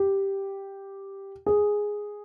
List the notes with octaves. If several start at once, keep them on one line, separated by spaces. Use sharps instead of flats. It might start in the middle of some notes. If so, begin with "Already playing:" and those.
Already playing: G4
G#4